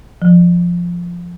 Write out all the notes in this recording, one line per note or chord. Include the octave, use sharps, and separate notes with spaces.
F3